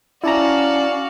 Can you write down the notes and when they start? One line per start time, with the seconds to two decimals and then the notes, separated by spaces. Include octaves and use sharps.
0.24 C#4 E4 F#4 D5 F5 A5 A#5